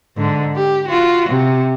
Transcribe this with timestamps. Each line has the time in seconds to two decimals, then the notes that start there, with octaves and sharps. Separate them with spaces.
0.17 G#2 D3
0.56 G4
0.88 F4 F#4
1.29 C3